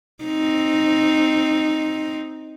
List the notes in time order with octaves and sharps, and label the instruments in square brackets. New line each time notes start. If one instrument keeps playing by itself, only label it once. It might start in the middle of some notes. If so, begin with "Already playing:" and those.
[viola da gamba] C4 D#4